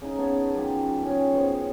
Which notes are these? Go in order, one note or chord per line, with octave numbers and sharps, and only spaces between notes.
C#3 D#4
B3 C#5 A5
F#2 F4 G4
C#4 G4 G#4 C#5
B2 C5 C#6